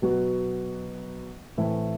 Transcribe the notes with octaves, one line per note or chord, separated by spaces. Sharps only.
B2 F#3 B3 F#4
A2 E3 A3 C4 E4